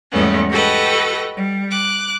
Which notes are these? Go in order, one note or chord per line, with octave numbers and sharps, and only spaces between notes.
E2 G#2 G3 A3 B3 C#4
F#4 G4 A4 B4 D#5
G3
D6 F#6